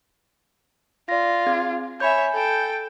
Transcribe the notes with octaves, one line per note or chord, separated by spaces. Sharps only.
F4 D5 A#6
C4 G#4 G#6
C#5 E5 G#5 B5 G6
A4 G5